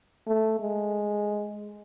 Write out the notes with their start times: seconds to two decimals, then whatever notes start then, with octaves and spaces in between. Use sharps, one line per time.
0.27 A3
0.60 G#3